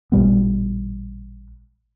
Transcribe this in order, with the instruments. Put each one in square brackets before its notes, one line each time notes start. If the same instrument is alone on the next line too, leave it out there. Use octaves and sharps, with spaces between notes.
[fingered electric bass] A1 A#2 G3 B3